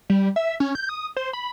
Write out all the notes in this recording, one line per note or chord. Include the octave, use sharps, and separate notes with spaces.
G3
E5
C#4
G6
D#6
C5
B5